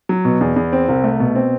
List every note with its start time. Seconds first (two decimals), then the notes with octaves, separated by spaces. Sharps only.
0.09 F#3
0.25 B2
0.41 E2
0.56 E2
0.73 C4
0.88 C2
1.04 A3
1.20 B2
1.35 C4